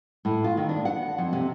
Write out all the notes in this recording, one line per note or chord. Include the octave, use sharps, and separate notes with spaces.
A2
F4
D#3
D4
F#5
F2
C3